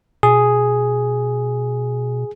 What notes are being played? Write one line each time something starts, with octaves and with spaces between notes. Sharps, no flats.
B2 G#4